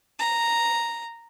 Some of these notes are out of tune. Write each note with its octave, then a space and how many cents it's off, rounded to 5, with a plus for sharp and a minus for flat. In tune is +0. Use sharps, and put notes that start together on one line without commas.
A#5 -5